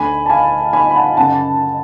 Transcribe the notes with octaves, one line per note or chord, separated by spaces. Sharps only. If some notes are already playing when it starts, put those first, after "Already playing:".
Already playing: D2 D3 G#5 B5
A5
F5 G#5
G#5 B5
B5
F#5 A5
F#2 C#3 F#5 A5